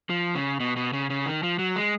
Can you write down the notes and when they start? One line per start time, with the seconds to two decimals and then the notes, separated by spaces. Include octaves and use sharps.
0.10 F3
0.35 C#3
0.60 B2
0.76 B2
0.93 C#3
1.10 C#3
1.26 D#3
1.43 F3
1.59 F#3
1.76 G#3